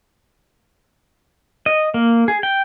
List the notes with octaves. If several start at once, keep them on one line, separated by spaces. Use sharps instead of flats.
D#5
A#3
G#4
G5